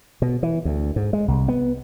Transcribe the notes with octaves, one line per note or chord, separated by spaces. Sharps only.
B2
E3
D2
G#2
G#3
C2
B3